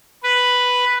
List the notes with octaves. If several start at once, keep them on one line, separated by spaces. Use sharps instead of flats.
B4